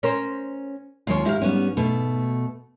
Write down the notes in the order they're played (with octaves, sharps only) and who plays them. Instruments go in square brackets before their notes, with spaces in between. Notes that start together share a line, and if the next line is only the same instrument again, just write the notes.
[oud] C#4 A#4 C5
[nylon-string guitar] D#2 G#3 C#5 [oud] F4
[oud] G#2 F5 [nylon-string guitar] D#4 E4 G4
[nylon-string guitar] G3 B3 C#4
B2 A3